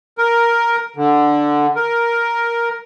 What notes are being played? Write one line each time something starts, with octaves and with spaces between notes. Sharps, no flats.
A#4
D3
A#4